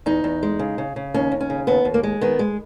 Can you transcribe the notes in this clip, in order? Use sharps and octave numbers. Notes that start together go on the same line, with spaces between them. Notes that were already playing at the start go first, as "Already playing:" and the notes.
E2 D#4
E2
G#3
C#3
C#3
C#3
D#2 C#4
D#2
C#4
C#3
D#2 B3
D#2
A#3
G#3
D#3 B3
G#3